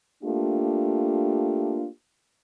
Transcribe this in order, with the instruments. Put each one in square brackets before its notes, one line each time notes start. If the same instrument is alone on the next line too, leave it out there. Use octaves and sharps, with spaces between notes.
[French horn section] A3 A#3 D4 F4 G4